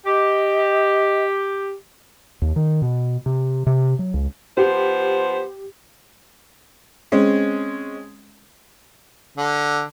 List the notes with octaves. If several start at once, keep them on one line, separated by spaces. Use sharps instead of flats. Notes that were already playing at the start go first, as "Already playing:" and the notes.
G4 D#5
D#2
D#3
B2
C3
C3
F#3
C#2
F3 B3 G4 C5
G#3 C4 C#4
D3